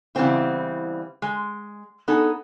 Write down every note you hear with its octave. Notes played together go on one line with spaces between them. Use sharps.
C#3 E3 G3 B3 C4 E4
G#3
B3 D#4 G#4 A4